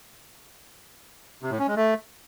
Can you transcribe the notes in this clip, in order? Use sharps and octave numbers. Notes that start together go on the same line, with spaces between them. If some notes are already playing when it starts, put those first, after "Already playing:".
C3
A2
C#4
G#3
A3